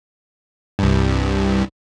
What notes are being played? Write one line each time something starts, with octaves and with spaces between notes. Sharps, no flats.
C2 G2